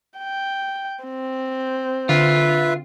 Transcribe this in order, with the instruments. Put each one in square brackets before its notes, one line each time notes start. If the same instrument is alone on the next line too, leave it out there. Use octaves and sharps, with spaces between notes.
[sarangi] G5
C4
[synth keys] D3 [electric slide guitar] F4 [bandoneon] B4 E5